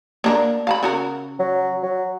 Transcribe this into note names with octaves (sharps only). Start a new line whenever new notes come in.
A#3 D4 A#4
F5 A5 B5
C#3 F#4 A#4
F#3
F#3